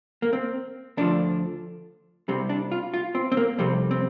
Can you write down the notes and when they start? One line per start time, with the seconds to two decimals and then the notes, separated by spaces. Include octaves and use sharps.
0.22 A#3
0.33 C4
0.97 D2 D3 F3 D4
2.28 C2 C3 G3 C4
2.49 D4
2.72 F4
2.94 F4
3.15 C4
3.32 C4
3.37 A#3
3.58 F2 C3 G3 C4
3.91 C4